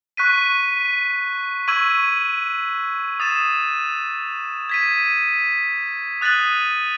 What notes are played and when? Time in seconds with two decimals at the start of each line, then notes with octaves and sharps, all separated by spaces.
0.17 C#6 F#6 B6 D#7
1.68 C#6 E6 G#6 D#7 F#7
3.20 D#6 A6 E7
4.69 G#6 B6 D#7
6.21 D#6 F#6 A6 D#7 F#7